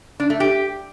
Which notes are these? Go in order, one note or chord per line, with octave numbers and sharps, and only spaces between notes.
D4
A3
G4